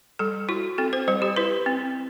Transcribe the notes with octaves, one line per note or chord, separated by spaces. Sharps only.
G3 A4
E4 F#4
C4 A4
C5
G3 C5
G4
E4 B4
C4